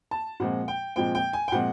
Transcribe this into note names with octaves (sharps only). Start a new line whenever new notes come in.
A5
A#2 F3 G#3 C4 F#5
G5
A#2 F3 G#3 C4 G5
G5
G#5
G5
A#2 F3 G#3 C4 F#5